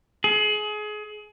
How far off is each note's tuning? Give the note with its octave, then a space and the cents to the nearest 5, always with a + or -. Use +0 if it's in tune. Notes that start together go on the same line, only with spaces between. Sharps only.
G#4 +30